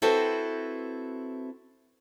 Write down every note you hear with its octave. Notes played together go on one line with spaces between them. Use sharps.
C4 E4 F#4 A4 B4 C5